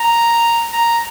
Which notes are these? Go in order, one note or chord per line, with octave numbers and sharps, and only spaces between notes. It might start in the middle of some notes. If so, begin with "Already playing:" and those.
Already playing: A#5
A#5